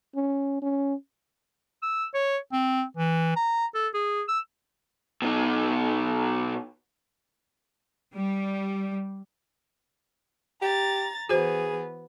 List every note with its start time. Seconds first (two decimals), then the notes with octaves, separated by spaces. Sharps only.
0.15 C#4
0.62 C#4
1.82 E6
2.14 C#5
2.52 C4
2.97 E3
3.36 A#5
3.75 A4
3.94 G#4
4.28 E6
5.22 B2 D#4
8.14 G3
10.62 G4 A#5 A6
11.29 E3 B3 F#4 G#4 C5